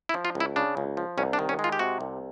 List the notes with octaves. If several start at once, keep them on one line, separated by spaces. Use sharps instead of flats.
E4
F3
F4
C#2
E4
C#3 D4
C#2
F3
C2 C#4
D4
D#3
C#4
G#3
F4
G4
C3 F#4
C2